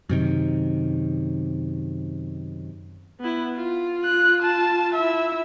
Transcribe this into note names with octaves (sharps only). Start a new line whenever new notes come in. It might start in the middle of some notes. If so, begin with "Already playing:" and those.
F#2 C3 D#3
B3 E4
F4
F#6
A5
E4 E5